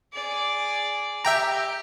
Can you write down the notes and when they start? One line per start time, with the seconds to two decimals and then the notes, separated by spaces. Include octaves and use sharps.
0.13 G#4 D5
1.25 G4 E5 G5 A#5